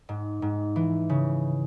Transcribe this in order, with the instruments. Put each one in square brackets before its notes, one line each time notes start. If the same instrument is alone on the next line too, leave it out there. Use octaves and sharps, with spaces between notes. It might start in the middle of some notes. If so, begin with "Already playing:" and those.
[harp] G#2
G#2
E3
C#3